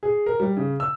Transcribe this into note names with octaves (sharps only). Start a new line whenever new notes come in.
G#4
A#4
G3
C#3
E6